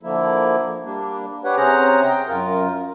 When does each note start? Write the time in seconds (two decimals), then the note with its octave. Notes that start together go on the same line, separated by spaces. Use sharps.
0.03 D3 F3 A#3 E4
0.84 G3 A#3 D4
1.44 D4 G4 B4 C#5 F#5
1.57 C3 C#4 G#4 C5 F#5 A#5
2.05 G5
2.28 F#2 F4 A#4